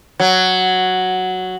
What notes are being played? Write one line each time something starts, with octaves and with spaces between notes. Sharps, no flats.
F#3